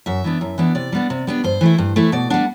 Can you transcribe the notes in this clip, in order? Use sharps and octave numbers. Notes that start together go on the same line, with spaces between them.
F#2 E5
E3 B3 D4
F#2
E3 B3 D4
C3 D5
G3 B3 D4
C3
G3 B3 D4
G2 C5
E3 A3 E4
G2
E3 A3 E4
B2 D5
G3 D4 F#5